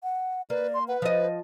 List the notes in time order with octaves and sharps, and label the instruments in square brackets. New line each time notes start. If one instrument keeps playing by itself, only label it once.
[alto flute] F#5
[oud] A#3 [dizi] B4 [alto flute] D5
[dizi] C6
[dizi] B4 [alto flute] F#5
[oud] F3 D#5 [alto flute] C5